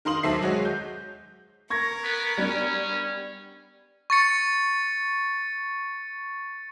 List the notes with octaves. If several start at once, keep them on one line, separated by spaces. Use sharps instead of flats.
D#3 A#4 F5 C6 D#6 F#7
D#2 F#3 A4 C5 E5 C7
F#3 G#3 F#4 G#4 C#5
G6
A#4 C#6 G#6 A#6
B3
G3 B3 C#4 D4
C#6 A6 C#7